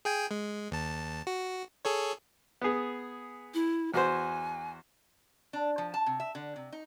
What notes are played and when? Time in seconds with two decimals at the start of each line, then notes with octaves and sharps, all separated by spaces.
0.05 G#4 G5 G#5
0.31 G#3
0.71 D#2 A5
1.27 F#4
1.85 G#4 A4 C#5
2.61 B3 G#4
3.54 E4
3.94 E2 F#4 C5 G#5
5.53 D4
5.78 F3
5.94 A5
6.06 C3
6.20 E5
6.35 D3
6.56 C3
6.72 D#4